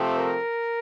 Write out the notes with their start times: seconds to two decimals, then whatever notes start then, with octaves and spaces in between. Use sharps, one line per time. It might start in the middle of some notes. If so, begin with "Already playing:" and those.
Already playing: C3 F3 A3 C4
0.16 A#4